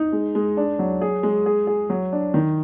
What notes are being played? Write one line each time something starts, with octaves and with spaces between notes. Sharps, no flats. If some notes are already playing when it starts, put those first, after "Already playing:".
Already playing: D#4
G#3
G#3
D4
F#3
G#4
G#3
G#4
G#4
F#3
D4
D#3